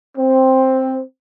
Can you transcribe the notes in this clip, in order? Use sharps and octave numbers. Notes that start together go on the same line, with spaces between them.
C4